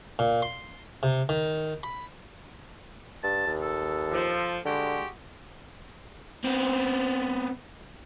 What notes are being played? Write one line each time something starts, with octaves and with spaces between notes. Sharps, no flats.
A#2
C6
C3
D#3
B5
G2 A5
D#2
A4
F3
D3 G#3 F#4 G4
B3 C4